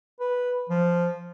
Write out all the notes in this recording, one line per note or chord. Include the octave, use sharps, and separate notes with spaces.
B4
F3